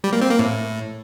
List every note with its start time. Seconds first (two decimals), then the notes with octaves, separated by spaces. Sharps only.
0.04 G3
0.13 A#3
0.22 C4
0.30 A#3
0.39 A2